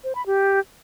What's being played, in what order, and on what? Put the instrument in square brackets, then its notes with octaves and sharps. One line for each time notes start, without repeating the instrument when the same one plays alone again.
[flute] C5
B5
G4